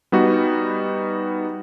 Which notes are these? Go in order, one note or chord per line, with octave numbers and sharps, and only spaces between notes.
G3 B3 D#4 F#4